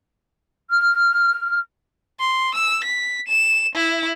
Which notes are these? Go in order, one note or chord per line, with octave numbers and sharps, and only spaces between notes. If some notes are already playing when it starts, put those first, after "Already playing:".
F6
C6
E6
B6
E7
E4